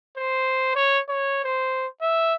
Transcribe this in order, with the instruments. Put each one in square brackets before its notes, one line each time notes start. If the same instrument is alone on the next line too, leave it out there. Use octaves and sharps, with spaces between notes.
[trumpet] C5
C#5
C#5
C5
E5